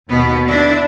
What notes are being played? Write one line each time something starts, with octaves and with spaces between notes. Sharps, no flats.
D#2 B2 B3
D3 D4 E4